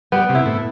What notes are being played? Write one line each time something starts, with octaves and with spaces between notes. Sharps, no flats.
G3 B3
C3
E4
A2